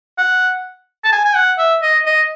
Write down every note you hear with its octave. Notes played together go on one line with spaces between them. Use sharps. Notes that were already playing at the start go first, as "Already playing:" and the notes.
F#5
A5
G#5
G#5
F#5
E5
D#5
D#5